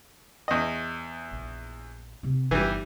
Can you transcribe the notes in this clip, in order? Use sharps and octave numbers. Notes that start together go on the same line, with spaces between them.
E2 D#5
A#1
C3 C4
G1 E3 G3 D#4